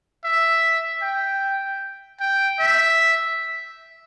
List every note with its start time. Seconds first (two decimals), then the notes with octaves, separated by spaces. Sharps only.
0.24 E5
1.02 G5
2.20 G5
2.59 E5